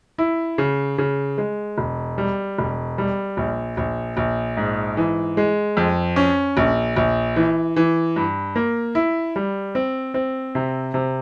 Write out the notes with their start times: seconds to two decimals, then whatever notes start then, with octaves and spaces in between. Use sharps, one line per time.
0.18 E4
0.58 C#3
0.98 C#3
1.38 G#3
1.78 E1
2.18 G3
2.58 E1
2.98 G3
3.37 A#1
3.77 A#1
4.17 A#1
4.57 G#2
4.97 E3
5.37 G#3
5.77 F2
6.16 C#4
6.57 A#1
6.96 A#1
7.36 E3
7.76 E3
8.16 G2
8.56 A#3
8.95 E4
9.36 G3
9.75 C4
10.14 C4
10.55 C3
10.94 C3